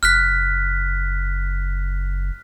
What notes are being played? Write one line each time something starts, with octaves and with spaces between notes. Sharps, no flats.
F#1 F6 F#6 B6